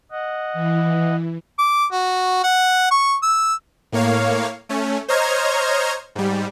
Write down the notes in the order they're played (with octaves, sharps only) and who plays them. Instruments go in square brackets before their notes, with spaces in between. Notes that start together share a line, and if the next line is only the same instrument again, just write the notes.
[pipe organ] D#5 F#5
[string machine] E3
[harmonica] D6
F#4
F#5
C#6
E6
[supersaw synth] A2 A#3 C#5 F5
A3 C#4
C5 C#5 D#5 A#5 F6 G#6
G#2 G3